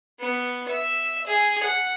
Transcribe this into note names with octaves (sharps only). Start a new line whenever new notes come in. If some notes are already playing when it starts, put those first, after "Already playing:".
B3
E5
G#4
F#5